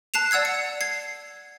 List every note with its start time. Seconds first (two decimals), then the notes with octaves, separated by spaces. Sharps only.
0.14 A5 F#6 C7 E7 F7
0.31 D5 F#5 E6 G#6 C7
0.45 C#7
0.81 G#6 C7